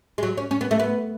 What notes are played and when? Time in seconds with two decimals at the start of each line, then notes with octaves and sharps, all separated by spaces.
0.18 G#3
0.23 F#3
0.38 C#4
0.51 C#4
0.61 B3
0.71 A3
0.79 B3